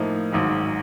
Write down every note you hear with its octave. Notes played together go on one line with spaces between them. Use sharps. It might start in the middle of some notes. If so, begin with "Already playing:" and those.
Already playing: A2 F3 A#3 D#4
G#1 G#2 D#3 F#3